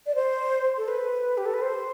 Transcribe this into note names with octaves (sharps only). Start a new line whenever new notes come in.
D5
C5
A4
B4
G4
A4
B4
C5